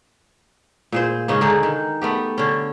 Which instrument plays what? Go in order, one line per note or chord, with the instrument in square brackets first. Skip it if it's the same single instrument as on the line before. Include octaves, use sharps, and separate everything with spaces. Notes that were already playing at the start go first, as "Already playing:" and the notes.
[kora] A#2 G#4 C5
G#2 C#3 C#4 D#5
D3 G#3 D#4 G#4
D#3
A3 B3 G4
D3 C#4